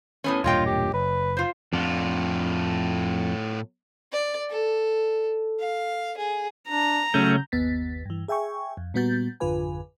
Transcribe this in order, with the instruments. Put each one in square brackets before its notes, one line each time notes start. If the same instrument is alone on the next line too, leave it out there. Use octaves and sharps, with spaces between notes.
[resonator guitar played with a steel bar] A2 B3 C#4
[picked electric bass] E1 G2 A#2 [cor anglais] F4 [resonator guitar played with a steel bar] C#5 D#5 G5
[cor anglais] G4
[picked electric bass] F#1 [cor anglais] B4
[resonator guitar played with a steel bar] F4 C5
[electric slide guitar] F2 D4 F#5 [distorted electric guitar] A2 F4
[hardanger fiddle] D5
A4
F5
G#4
[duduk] D4 [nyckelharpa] A#5
[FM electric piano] C#3 G6 [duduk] F#3 [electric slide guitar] A3 C#4
[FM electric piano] G1 D#2 B3 A6 B6
G2 E3
G#4 E5 G5 G#5 C#6
F2
A#2 G3 B3 F#4 G6 A6
G#1 F2 D3 F4 B4 G#5